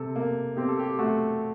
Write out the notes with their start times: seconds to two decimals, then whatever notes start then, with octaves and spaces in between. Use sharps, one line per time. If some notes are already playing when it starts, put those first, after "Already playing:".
Already playing: C3 A4
0.16 A#3
0.57 C4 G4
0.68 A4
0.79 G4
0.99 A3 F#4